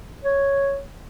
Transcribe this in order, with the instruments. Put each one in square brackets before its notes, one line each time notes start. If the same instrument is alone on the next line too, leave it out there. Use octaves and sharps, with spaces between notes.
[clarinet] C#5